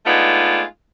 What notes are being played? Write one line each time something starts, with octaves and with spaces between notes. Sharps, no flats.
G#3 A3 B3 D4 D#4 F4